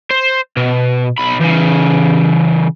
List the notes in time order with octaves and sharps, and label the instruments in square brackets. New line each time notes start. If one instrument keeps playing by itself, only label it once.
[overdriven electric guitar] C5
B2
B1 B5
C#3 E3